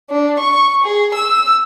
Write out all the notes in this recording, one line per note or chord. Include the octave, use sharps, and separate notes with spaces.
D4
C#6
G#4
E6